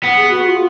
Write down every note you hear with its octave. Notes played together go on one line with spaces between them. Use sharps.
B3
G#4
F#4
F#4
F4